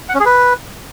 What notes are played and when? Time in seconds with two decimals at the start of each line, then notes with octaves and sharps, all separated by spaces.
0.09 F#5
0.14 C#4
0.20 G#4
0.25 B4